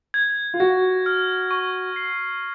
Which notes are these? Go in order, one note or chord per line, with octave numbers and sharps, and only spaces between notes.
G#6
F4
F#4 A#6
F6
C#6
C7